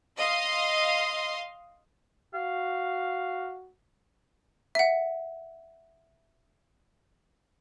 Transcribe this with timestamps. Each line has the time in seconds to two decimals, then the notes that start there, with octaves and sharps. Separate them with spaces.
0.17 D#5 F5 C6
2.34 F#4 F5
4.75 E5 F#5